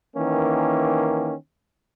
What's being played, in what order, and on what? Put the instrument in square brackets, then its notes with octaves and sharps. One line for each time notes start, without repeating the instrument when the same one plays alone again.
[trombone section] D#3 E3 A#3 C#4